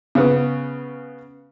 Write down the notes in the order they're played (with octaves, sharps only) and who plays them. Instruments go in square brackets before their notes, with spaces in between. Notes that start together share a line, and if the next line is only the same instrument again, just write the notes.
[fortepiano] C#3 B3